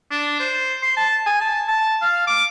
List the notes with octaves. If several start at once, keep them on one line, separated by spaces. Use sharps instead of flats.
D4
C5
C6
A5
G#5
A5
A5
F5
D6